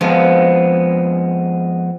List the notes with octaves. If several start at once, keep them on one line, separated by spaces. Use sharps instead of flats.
F2 F3 G#3 B3